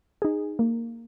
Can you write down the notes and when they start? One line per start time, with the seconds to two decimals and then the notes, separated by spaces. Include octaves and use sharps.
0.22 D#4 G#4
0.59 A#3